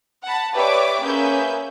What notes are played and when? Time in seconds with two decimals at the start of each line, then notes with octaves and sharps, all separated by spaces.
0.25 F#5 A5 B5
0.54 G4 B4 C#5 D5 E5 D6
1.03 A#3 C#4 G#4 B4 E5 G6